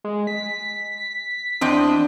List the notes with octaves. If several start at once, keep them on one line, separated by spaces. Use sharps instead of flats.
G#3
B6
E2 C4 D4 D#5